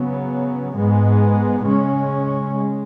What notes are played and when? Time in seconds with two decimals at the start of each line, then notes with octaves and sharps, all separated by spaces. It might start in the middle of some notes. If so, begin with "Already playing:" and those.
Already playing: C#3 F#3 B3
0.76 G#2 G#3 B3
1.65 C#3 G#3 C#4
2.55 G#3